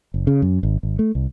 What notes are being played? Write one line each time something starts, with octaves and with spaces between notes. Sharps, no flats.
F#1
C#3
F#2
G#1
G#1
A3
C2